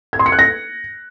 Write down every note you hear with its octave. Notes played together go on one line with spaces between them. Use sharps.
G#6
C6
C#7
F#6
A#6